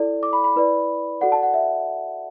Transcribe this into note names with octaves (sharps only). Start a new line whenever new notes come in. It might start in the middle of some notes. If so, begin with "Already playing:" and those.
Already playing: E4 A4 D5
D6
B5
B5
E4 B4 D5
F#4 A4 D5 F#5
A5
F#5
E5